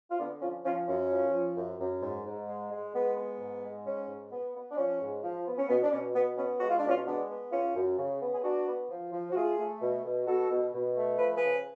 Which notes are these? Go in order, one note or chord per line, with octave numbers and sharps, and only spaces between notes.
F4
D3 B3 D4
F3 C#4 F4
F3 C#4 F4
F#2 C#4
F3
F3
F#2
F#2
G#2
G#2
G#3
G#3
G#3 B3
B3
G#2
G#3
G#2 C#4
G#2
B3
B3
D4
F3 C#4
G#2
F3
B3
C#4
B2 B3
D4
B2 C#4
B2 B3
B3 C#4
G#3 F#4
F4
D4
B2 C#4 F4
G#3 B3 D4
B3
C#3 C#4 F4
F#2
C#3
B3
G#4
B3 D4 F#4
B3
F3
F3
F#4
A3 F4 G#4
A3
B2
B2
B2 F#4 A4
B2
B2
A3
F3 B4
C#3 G#4 B4